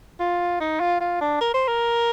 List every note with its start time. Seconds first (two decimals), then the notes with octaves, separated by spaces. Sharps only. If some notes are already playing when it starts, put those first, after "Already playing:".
0.20 F4
0.60 D#4
0.80 F4
1.00 F4
1.21 D4
1.41 A#4
1.54 C5
1.68 A#4